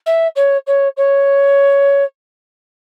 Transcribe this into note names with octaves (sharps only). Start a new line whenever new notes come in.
E5
C#5
C#5
C#5